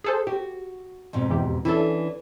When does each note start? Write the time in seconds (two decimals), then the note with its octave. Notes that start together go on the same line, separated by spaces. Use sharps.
0.04 G#4 A4 C5
0.27 F#4 G4
1.13 F2 G#2 B2
1.30 E2 G4
1.65 E3 C#4 D4 E4 A4